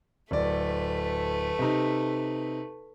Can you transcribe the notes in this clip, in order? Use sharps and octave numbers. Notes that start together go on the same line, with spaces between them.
D1 A3 B4 D5
C3 D#4